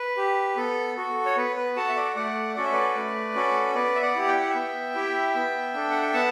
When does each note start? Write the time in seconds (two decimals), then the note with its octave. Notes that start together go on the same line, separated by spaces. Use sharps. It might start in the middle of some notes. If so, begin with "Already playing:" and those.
Already playing: B4
0.17 G4
0.57 B3 A4
0.96 F#4 A4
1.26 C#5
1.37 B3 B4
1.56 B4
1.76 F#4 A4 F#5 A5
1.88 E5
1.96 D5 F#5
2.16 A3 D5 F#5
2.56 C#4 F#4 A4 D5
2.64 E5
2.72 B4 D5
2.95 A3
3.35 C#4 F#4 A4
3.75 B3 B4 D5
3.95 E5
4.02 D5 F#5
4.15 E4 G4
4.28 G5
4.39 F#5
4.49 E5 G5
4.55 B3
4.95 E4 G4
5.35 B3
5.74 D4 A4
5.90 F#5
6.02 G5
6.13 B3 F#5 A5